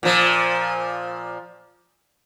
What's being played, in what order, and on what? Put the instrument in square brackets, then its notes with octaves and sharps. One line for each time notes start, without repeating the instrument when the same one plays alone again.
[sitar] A#2 F3